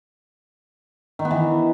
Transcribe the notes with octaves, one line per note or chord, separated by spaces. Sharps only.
D#3
B3
E3